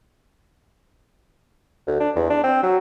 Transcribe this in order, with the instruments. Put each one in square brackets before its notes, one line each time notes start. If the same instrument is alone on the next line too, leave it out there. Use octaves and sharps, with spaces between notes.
[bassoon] D2
D4
E2
D4
C4
F#3